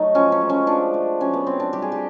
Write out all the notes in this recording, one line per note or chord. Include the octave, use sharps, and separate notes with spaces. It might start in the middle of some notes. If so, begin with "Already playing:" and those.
Already playing: F#3 A3 D#4
F3 C#4
C#4
G#3
C#4
F3 D4
A3
F#3 C#4
B3
A3 C4
D4
G3 G4
G#4
G4